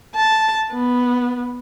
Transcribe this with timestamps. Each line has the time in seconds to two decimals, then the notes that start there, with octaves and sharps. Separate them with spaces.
0.16 A5
0.72 B3